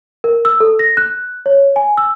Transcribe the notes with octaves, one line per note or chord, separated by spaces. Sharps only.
A#4
E6
A4
A#6
F#6
C#5
G#5
E6